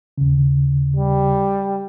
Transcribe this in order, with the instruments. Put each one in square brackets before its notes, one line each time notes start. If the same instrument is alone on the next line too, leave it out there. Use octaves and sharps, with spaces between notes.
[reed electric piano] D#2 C#3
[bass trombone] G3